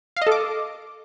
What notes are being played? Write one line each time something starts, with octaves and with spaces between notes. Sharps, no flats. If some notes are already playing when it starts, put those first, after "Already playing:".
F5
D#5
A4
D6